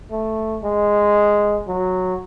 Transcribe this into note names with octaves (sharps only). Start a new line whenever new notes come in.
A3
G#3
F#3